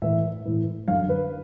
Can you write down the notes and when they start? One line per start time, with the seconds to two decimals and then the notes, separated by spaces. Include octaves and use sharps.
0.02 A2 E3 E5
0.45 A2 E3
0.88 F#2 D3 F5
1.09 B4